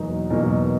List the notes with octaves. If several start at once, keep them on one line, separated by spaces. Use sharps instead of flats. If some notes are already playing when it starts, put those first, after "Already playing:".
Already playing: E2 B2 F#3 A#3 D#4
E2 B2 F#3 A#3 D#4